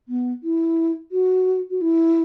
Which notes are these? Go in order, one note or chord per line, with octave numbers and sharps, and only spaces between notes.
B3
E4
F#4
F#4
E4